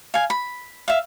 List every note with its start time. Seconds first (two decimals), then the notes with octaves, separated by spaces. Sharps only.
0.14 F5 G#5
0.30 B5
0.88 E5 F5